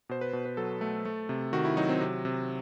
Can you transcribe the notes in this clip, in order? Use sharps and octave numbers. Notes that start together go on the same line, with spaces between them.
B2 C5
B4
B2
B4
F#3 A4
A3
A3
C3
D#3 F#4
E4
F#3 D#4
C4
C3
C3